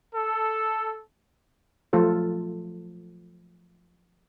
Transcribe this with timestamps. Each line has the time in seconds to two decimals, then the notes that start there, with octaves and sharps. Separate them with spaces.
0.14 A4
1.93 F3 F#3 A3 F4 A4 C5